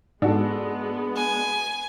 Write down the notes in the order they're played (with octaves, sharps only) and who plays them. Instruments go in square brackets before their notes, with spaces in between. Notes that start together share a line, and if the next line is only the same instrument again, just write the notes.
[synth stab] G#2 [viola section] G#3 B3 [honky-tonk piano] D4 F#4 A4
[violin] G#5